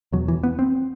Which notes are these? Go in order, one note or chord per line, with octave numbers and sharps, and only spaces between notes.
E2 B2 F#3
E3
B3
C4